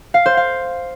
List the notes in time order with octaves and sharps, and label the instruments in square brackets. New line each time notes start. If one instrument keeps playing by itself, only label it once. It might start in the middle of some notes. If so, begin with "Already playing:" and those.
[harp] F5
C5
F5